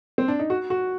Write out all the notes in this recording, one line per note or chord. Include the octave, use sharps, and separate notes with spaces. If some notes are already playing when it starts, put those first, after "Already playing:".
C4
D4
D#4
F#4
F#4